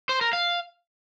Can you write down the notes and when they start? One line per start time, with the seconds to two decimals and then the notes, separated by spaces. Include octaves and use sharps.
0.09 C5
0.21 A#4
0.33 F5